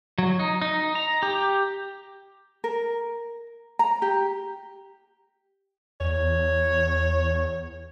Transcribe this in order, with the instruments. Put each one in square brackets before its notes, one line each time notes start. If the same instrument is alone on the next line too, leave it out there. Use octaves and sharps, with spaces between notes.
[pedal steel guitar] F#3
D#4
D#4
A#5
G4
[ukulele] A#4
A#5
G4
[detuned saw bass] E2 [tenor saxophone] C#5